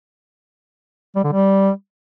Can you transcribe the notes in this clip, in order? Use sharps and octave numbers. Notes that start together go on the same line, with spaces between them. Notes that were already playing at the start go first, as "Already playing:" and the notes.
G3
D3
G3